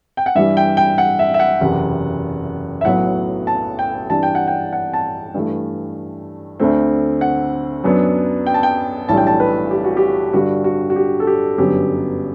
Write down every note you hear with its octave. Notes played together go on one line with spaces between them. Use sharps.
G5
F#5
G2 E3 G3 E5
G5
G5
F#5
E5
E5
F#5
F#1 E2 C3
E5
B1 A2 F#3 B3 F#5
A5
G5
G2 E3 G3 D4 A5
G5
F#5
G5
F#5
A5
G2 E3 A3
D2 D3 A3 C4
F#5
F#2 F#3 B3 D4
G5
A5
G5
B1 A2 E3 G3 D4 A5
G5
A5
B4
G4
F#4
G4
G2 D3 G3 D4 F#4
F#4
F#4
G4
A4
G4
G1 F#2 D3 F#3 B3 G4